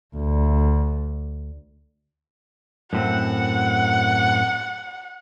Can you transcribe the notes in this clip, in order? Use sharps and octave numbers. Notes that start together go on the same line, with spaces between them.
D2
F#2 A2 C4 F#5